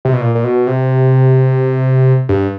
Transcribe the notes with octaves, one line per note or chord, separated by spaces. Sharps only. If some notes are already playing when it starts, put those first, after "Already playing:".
C3
B2
A#2
A#2
B2
C3
G2